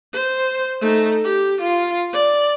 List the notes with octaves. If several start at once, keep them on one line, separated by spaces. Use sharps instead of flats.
C5
A3 D#4
G4
F4
D5